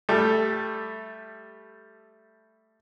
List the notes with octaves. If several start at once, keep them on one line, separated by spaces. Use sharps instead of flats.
G3 A3 A4